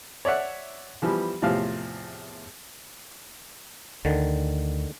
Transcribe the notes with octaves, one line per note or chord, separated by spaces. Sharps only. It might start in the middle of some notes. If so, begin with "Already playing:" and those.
C#5 D5 E5 F#5
E3 F3 G3 B3
E2 A2 C3 F3 F5
D2 D3 D#3